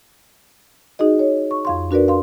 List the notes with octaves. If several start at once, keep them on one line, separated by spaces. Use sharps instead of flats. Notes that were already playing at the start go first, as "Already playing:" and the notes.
D#4 F#4 G#4 D#5
C#5
C#6
F2 F5 C6
D4 F#4 A#4 B4 D5
F5 C6